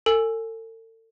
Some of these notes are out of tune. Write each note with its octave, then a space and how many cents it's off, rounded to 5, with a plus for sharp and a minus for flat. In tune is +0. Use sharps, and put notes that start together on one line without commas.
A4 +40 G#5 +0